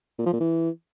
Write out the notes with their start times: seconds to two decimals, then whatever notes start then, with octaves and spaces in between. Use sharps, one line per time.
0.19 A#2
0.26 F3
0.33 A#2
0.41 E3